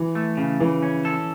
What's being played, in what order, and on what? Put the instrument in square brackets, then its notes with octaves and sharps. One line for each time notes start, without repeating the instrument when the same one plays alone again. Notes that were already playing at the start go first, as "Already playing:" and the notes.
Already playing: [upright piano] E3
[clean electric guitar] A3
C#3
[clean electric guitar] C#3 [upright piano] E3
[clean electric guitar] C#4
A4